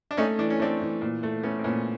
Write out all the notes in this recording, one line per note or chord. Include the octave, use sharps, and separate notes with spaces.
D4
A3 C#4 D#4
E3 D4
C#4
A3 C4 D4
E3
A#2
A3
A3 B3 C#4
C4
A#2 B3 C#4